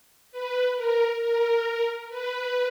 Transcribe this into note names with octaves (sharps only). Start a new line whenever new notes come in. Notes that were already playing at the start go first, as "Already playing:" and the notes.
B4
A#4
A#4
B4